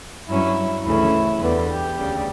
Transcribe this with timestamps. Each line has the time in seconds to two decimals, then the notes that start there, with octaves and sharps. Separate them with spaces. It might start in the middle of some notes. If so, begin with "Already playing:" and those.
0.28 G2 F#3 C#4 E4
0.85 D2 C#3 E3 A3 C#4 E4
1.41 E2 D3 G3 B3
1.69 G4
1.98 D2 C#3 G3